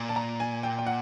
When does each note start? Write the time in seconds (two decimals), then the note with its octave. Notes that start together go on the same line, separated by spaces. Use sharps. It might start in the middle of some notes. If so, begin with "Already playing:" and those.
Already playing: A#2
0.09 A5
0.16 A#5
0.40 G#5
0.63 G5
0.79 G5
0.86 F#5